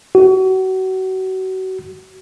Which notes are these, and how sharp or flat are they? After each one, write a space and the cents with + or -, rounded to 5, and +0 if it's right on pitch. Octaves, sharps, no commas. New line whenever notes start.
F#4 +30